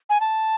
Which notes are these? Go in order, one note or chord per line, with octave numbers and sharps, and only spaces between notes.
G#5
A5